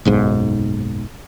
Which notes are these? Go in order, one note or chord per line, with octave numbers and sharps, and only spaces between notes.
F#1 B1 G#2